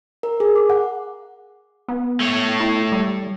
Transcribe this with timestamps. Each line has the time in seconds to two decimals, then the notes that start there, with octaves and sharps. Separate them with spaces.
0.23 A#4
0.40 G#4
0.56 D6
0.70 F#5
1.88 B3
2.20 A3 C#5
2.60 E4
2.92 G3